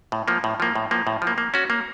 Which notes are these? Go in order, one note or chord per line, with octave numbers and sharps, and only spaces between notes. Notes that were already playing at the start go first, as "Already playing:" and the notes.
A2
F3 A#3
A2
F3 A#3
A2
F3 A#3
A2
F3
A#3
A#3
C#4 F#4
A#3